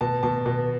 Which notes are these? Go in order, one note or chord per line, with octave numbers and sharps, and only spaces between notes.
B2 A5
B2 A5
B2